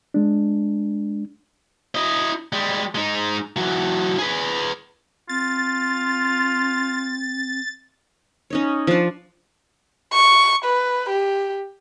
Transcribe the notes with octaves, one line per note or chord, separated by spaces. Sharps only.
G#3 D4
E4 D#5
G3 G#3
G#3 D#4
E3 F#3
G#4 B4
C4 F4 A6
C#4 D#4 C#5
F3 D4
C#6
B4
G4